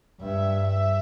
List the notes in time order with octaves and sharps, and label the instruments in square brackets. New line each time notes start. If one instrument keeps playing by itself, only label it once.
[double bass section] G2 [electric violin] E5
[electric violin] E5